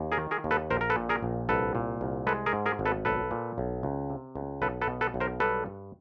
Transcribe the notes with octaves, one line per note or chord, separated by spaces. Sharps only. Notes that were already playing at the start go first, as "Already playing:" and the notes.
Already playing: D#2
G#4 A#4
D#3
G#4 A#4
D#2
A4 B4
A#1 A#4 C5
A#4
A4 B4
A#2
G#4 A#4
A#1
C2 A4 B4
A#2
C2
G#3 A4 B4
G#4 A#4
G#2
G#4 A#4
G#1
A4 B4
B1 A4 B4
A#2
B1
C#2
C3
C#2
B1 A4 B4
A4 B4
B2
A4 B4
B1
A#4 C5
G3 A4 B4
G2